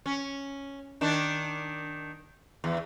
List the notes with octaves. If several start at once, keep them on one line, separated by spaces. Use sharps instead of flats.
C#4
D#3 D4
E2